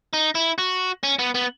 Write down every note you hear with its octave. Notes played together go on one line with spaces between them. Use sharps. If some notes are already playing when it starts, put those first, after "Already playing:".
D#4
E4
F#4
C#4
B3
B3